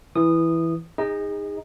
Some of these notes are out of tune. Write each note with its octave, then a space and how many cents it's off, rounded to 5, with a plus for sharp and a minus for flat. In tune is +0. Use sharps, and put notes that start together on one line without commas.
E3 +0 D#6 -15
D#4 +0 G#4 -30 D#5 +0